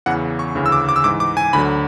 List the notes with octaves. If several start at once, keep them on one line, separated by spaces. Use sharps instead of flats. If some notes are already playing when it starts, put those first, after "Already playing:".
E2 C#3 E3 F#5
C#6
D2 C#3 E3
E6
D6
D6
E6
G#2 E3 D6
D6
G#5
D2 D3 F#3 B5